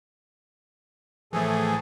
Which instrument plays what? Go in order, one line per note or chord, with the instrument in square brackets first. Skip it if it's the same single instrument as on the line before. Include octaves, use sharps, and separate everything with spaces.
[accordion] A2 G#4 A4 [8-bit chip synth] E3 F3 A3